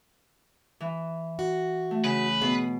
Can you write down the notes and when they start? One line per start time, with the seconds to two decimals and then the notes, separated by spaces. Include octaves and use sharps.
0.80 E3
1.39 F#4
1.91 A3
2.04 C#3 B4
2.41 B2 G#4 F#5